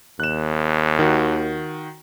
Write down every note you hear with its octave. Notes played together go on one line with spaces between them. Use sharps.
D#2 F#6 E7
D#3 F#4